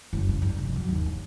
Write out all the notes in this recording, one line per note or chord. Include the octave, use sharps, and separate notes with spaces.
F#1
G2
G2
F1
F#3
D#2
G2